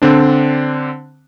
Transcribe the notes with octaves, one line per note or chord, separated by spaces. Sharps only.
D3 C4 D4